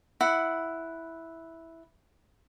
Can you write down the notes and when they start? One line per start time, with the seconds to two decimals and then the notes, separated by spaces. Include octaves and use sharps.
0.21 E4 F#5